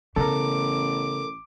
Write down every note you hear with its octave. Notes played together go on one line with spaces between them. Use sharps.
A1 C#3 B3 A4 A#4 D6